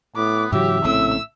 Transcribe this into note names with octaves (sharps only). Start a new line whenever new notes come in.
A2 B3 D6
G#2 C#3 E3 F#3 G4 E5
A#1 A2 C#3 C4 E6